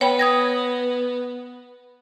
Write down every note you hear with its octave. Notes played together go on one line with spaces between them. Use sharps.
B3 C#5 G5 B5
D#6 G#6 A#6